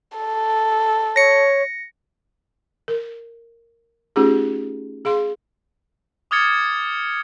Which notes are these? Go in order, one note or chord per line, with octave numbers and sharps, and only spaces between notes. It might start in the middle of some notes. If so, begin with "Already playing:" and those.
A4
C#5 A#6 C#7
A#4
A3 C#4 D#4 F4 G4 G#4
G#4 F5 C6
D6 D#6 F6 G#6 A6 C#7